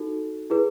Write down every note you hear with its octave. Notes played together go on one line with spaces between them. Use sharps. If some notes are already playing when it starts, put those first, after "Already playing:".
Already playing: D#4 F#4 A4
E4 G#4 B4